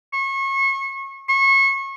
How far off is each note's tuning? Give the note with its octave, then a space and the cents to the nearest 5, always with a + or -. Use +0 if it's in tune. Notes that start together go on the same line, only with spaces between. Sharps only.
C#6 -30
C#6 -30